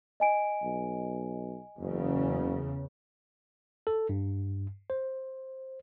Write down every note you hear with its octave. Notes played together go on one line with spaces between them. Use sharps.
D#5 G#5 D7
B1
F#1 E2 C#3
A4
G2
C5